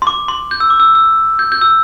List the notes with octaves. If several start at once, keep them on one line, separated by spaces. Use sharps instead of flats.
C6
D6
C6
G6
E6
D6
E6
E6
G6
G6
E6